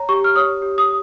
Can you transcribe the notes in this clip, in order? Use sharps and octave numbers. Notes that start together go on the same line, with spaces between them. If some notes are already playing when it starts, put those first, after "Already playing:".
Already playing: C#5 A#5
G4 C#6
F6
C#5 D#6
G4
D#6